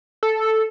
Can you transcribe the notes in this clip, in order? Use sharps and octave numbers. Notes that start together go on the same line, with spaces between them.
A4